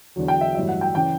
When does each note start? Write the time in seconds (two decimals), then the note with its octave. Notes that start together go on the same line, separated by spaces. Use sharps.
0.16 E2 D3 F#3
0.28 G5
0.41 E5
0.54 A1 G2 F#3 E5
0.69 F#5
0.81 G5
0.95 C#3 E3 G5